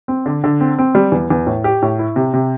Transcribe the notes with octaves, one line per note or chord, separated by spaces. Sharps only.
C4
D3
D3
C4
C4
G3
E2
E2
A2
G4
A2
E4
C3
C3